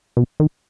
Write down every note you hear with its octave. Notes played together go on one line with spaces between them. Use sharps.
B2
D#3